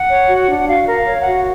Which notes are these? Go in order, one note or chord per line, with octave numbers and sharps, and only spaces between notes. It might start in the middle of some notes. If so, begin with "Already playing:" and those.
Already playing: F#5
C#5
F#4
D4
F#4 F5
A#4
F5
C#5
F#5
F#4